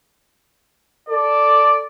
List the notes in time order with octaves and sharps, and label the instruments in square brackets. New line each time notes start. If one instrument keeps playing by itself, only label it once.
[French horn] A4 [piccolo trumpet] D5